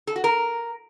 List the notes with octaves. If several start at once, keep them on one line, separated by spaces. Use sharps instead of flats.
A4
F#4
A#4